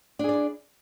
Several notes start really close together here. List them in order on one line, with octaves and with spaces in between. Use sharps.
D4 G#4 D5 E4